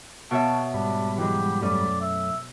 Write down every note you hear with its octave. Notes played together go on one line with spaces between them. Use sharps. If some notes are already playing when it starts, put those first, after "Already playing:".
B2 C#5 E5 F5 A5
G#2 G3 D4 B5
E3 F#3 G#3 G4
F#2 A3 C#4 D5
E5